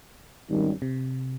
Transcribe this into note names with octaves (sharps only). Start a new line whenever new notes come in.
G#1 F#2 D#3 G3
C3